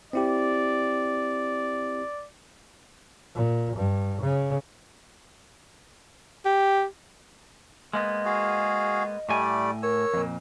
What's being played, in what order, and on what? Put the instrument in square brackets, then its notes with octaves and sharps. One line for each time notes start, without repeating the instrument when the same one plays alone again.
[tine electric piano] C4 E4 G4 [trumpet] D5
[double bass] A#2
G2
C#3
[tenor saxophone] G4
[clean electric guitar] G#3 A#3 B3 [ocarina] D#5
[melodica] F#4 G#4 F5
[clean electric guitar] A2 G#5 [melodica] G3 A3 D5
[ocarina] A#4 [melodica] C#5 E6
[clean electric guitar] F2 A#2